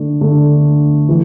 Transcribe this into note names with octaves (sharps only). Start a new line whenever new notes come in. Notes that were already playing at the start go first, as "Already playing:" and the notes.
Already playing: D3 A3 D4
D3 A3 D4
E3